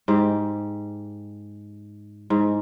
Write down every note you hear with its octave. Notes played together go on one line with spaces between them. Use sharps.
G#2 G4
G#2